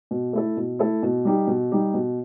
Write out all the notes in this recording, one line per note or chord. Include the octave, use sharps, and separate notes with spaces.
B2
A3 E4 A4
B2
A3 E4 A4
B2
G3 D#4 G4
B2
G3 D#4 G4
B2